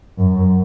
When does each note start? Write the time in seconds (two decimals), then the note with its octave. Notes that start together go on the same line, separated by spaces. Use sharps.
0.18 F#2